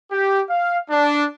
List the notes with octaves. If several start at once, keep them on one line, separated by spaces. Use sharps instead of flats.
G4
F5
D4